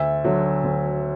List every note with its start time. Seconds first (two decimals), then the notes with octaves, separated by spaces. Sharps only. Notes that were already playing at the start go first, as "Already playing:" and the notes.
Already playing: D2 E5
0.24 D3 F#3
0.64 D2